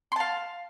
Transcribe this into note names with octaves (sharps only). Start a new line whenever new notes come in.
F5 A5 C6